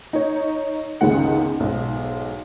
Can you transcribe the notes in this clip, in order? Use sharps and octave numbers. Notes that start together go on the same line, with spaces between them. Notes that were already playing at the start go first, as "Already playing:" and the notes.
D#4 C#5
G1 C#2 D#3 G#3 F#5
B1 G#2